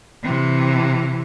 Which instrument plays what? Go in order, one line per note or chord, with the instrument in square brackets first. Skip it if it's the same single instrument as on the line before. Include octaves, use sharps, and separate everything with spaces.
[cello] C3 E3